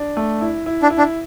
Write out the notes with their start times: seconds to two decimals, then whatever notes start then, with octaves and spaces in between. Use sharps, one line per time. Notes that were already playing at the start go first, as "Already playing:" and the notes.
Already playing: D4
0.17 A3
0.41 E4
0.66 E4
0.83 D4
0.90 E4
0.98 D4